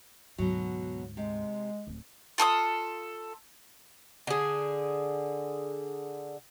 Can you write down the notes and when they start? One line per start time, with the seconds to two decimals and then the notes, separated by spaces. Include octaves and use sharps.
0.38 D2 G#2 B2 F#3
1.17 C3 G#3
1.87 D1 C4
2.38 F4 A4 C#6 D#6
4.27 D3 G#4